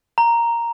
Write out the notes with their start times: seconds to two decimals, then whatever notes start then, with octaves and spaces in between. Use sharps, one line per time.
0.18 A#5